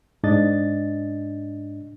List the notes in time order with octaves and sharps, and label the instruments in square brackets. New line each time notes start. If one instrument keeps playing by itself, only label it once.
[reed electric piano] G#2 D4 D#5 A6